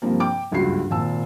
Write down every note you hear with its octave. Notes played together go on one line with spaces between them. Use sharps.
G2 C3 F3 A#3
G5 D6
F#1 C#2 G2 F#4 C7
G#1 A#2 A5 E6